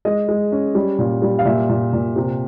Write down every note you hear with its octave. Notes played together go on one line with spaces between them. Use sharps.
G#3 D#5
G#3
C#4
G3
A#2
G3
F5
A#2 E5
A#2
A#2
C3